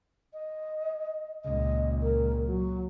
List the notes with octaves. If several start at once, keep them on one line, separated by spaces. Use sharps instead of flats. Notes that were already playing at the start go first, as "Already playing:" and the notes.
D#5
C#2 A#2 D#5
A#4
F#3